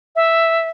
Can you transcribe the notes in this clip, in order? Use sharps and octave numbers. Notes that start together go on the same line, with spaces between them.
E5